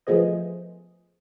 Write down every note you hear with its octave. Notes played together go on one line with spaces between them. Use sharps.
F3 A3 B3 G#4 C5 D#5